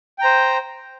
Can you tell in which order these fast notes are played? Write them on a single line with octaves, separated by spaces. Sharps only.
G5 A#5 C5